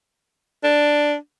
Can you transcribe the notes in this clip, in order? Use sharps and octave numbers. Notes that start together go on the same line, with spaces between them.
D4